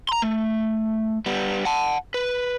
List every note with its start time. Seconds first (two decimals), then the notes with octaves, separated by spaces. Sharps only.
0.09 A#5 C6
0.22 A3
1.26 G3 B3
1.65 F#5 A5
2.14 B4